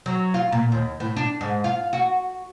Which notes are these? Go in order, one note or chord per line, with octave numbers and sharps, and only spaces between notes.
F#3
F4
A#2
D#2
A2
D4
G#2
F4
F#4